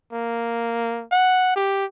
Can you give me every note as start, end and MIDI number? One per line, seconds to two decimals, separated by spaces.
0.13 1.04 58
1.11 1.51 78
1.56 1.85 67